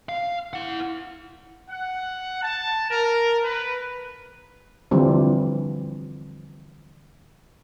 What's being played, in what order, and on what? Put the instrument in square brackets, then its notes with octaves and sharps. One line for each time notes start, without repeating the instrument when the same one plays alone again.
[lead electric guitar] F5
E4 F#5
[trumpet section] F#5
A5
A#4
B4
[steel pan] D3 E3 F3 G3 C4